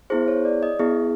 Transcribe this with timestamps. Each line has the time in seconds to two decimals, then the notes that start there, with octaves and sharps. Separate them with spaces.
0.10 B3 E4 G#4 C5
0.28 C#5
0.45 D5
0.63 D#5
0.79 B3 E4 G#4